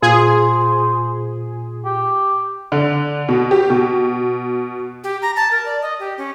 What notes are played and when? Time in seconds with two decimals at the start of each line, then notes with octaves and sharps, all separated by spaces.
0.02 A#2 F4 G#4 C5
1.85 G4
2.72 D3
3.29 B2
3.51 G4
3.70 B2
5.04 G4
5.22 A#5
5.36 A5
5.51 A#4
5.66 D5
5.82 D#5
5.99 G4
6.18 C#4